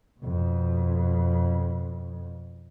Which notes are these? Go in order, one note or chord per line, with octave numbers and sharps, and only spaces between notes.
F2 B2